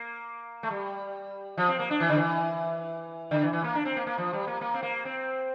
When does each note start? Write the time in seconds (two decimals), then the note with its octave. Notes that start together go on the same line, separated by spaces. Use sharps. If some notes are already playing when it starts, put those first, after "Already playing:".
Already playing: A#3
0.63 A3
0.71 G3
1.57 F3
1.68 C4
1.79 A#3
1.90 D4
2.00 E3
2.09 D3
2.17 E3
3.31 D3
3.43 E3
3.53 E3
3.64 A#3
3.75 D4
3.85 C4
3.96 A#3
4.07 A#3
4.18 F3
4.33 G3
4.47 A#3
4.61 A#3
4.74 C4
4.83 A#3
5.05 C4